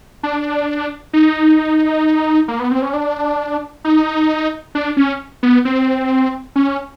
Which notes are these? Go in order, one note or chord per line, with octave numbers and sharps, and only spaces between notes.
D4
D#4
A#3
B3
C4
C#4
D4
D#4
D4
C#4
B3
C4
C#4